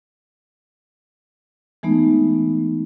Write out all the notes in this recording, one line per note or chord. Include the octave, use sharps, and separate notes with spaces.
E3 G#3 A3 B3 D#4